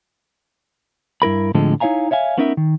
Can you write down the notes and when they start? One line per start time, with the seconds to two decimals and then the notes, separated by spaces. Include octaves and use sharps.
1.22 G2 E4 A#4 B5
1.54 A2 D3 F3 G#3 C4 A4
1.80 D#4 E4 C#5 F5 G#5 A#5
2.11 C#5 E5 F5 G#5
2.38 B3 C#4 D#4 A#4 B4 E5
2.57 D#3